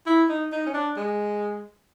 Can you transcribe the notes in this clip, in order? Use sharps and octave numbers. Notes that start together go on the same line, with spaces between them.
E4
D#4
D#4
C#4
D4
G#3